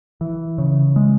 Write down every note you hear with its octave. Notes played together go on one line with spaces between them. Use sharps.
E3
C#3
G#3